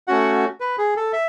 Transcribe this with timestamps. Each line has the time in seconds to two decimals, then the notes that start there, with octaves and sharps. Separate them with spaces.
0.07 A3 C#4 F#4 F#5
0.60 B4
0.78 G#4
0.97 A4
1.13 E5